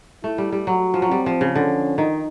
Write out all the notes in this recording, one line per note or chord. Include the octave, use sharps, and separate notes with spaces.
A3 E4
G3
G3
F#3 F#4
F3
F#3
G3 C4
F3
C#3
D3 C#4
D#3 D#4